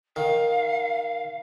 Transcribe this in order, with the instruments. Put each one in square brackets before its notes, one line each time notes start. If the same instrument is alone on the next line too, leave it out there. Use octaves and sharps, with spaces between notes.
[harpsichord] D#3 [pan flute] F5